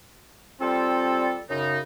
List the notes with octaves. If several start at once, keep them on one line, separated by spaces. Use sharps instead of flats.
G3 C4 F4 A4
F#2 C#3 D#4